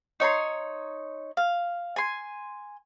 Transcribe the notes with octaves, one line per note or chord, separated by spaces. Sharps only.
D#4 C#5 A#5 C6
F5
G#5 C6